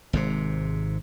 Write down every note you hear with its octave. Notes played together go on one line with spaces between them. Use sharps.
G#1 G#2 C3